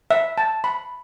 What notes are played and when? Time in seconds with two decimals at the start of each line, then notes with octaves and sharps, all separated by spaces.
0.11 E5
0.38 A5
0.64 B5